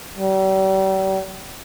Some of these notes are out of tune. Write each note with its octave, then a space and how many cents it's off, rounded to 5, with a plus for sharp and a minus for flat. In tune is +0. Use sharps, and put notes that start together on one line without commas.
G3 -40